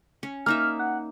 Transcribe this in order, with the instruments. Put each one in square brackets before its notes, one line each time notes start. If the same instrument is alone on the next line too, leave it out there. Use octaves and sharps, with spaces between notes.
[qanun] C#4
[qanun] A#3 D#4 E5 [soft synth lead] F6
[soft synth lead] F#5